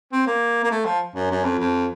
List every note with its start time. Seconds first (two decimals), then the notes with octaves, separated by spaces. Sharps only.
0.12 C4
0.27 A#3
0.64 A#3
0.71 A3
0.85 F3
1.15 F#2
1.30 F#2
1.44 F2
1.59 F2